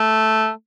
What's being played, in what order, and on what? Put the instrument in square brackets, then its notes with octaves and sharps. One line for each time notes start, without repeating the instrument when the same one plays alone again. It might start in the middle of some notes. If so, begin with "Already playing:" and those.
Already playing: [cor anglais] A3